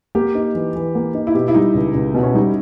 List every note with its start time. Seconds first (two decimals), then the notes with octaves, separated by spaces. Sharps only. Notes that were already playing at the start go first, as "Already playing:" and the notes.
0.15 A#3 G4
0.35 D#4
0.55 E3
0.75 E3
0.95 A#3
1.15 D#4
1.27 E4
1.34 B2 G4
1.48 E4
1.54 G3 D#4
1.74 C#2
1.95 C#2
2.14 B2
2.23 C#4
2.34 G3 D#4